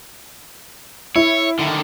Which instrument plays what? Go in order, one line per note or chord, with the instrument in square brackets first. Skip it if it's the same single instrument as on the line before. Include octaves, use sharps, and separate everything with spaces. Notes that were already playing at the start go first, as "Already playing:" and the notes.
[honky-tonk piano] E4 [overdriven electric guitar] C#5
[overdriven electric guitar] D3 D#3